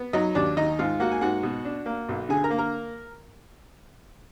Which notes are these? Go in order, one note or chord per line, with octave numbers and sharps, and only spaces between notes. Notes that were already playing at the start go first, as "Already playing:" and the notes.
Already playing: B3
F#3 D#4 D#5
D#2 D4 D5
D#3 D#4 D#5
G#2 F4 F5
A#3 F#4 F#5
G#5
G#2 F#4 F#5
B2
D4
A#3
B1
D3 G#4 G#5
A#4 A#5
A#3
A#4 A#5